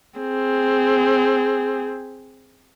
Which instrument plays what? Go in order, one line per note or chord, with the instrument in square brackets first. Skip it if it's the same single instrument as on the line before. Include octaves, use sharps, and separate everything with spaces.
[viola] C4 G#4